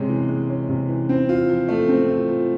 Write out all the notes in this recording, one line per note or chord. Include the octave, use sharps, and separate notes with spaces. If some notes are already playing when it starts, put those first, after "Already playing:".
Already playing: C3 G#3 C#4
E3
G#3
C#4
C3
E3
C4
F4
F3
A3
C4
F4
F3